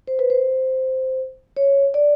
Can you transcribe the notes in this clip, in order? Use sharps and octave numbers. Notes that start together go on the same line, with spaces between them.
C5
B4
C5
C#5
D5